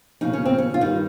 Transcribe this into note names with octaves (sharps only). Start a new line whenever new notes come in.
D#2 C#3 F3 D#4
C#4
C4
C#4
F4
G2 D#3 D#4